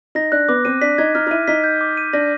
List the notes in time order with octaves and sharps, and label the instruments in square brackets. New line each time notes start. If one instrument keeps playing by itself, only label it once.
[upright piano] D#4 [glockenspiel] A#6
[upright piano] D4 [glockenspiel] F#6
[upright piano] B3 [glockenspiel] D6
[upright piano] C4 [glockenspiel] D#7
[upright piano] D4 [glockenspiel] B6
[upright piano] D#4 [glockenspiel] G#6
[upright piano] D#4 [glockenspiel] F6
[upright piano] D#4
[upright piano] E4 [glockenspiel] D#7
[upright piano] D#4 [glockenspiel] B6
[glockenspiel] G6
D6
D#7
[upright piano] D4 [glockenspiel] A#6